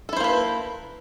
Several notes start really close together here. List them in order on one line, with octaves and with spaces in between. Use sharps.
A4 E4 C5 A#3 B4